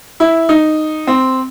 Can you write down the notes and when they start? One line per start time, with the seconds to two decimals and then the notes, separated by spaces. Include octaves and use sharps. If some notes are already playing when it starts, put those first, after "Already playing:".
0.20 E4
0.49 D#4
1.07 C4